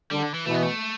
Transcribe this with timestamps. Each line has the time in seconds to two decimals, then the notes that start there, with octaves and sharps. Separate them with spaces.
0.11 D3 G3
0.23 D3
0.34 E3
0.46 B2 E3 A3
0.54 B3
0.63 A3